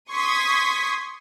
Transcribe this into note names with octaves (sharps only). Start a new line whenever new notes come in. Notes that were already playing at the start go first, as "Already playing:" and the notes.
C6 C#6 D#6 G#6 B6